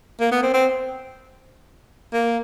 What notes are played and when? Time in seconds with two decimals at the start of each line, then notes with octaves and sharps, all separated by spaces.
0.20 A#3
0.32 B3
0.43 C4
0.54 C4
2.13 A#3